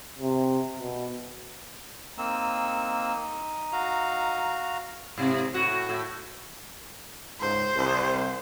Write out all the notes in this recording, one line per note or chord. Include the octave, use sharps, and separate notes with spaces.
C3
B2
A#3 C4 D#4 E6
F#4 F5 A#5
G#2 C3
A2 F#4
A2
C#2 G#2 C5
C2